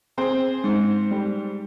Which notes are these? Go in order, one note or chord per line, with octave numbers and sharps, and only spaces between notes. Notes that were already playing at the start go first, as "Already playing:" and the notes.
C4 G#4 C5
G#2
G3